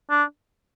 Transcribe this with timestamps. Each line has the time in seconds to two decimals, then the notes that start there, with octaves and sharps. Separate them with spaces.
0.10 D4